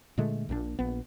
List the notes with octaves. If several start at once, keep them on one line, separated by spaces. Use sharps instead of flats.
A#2 D3 G#3 A3
A#1 A#2 D#3 D4
A#1 B3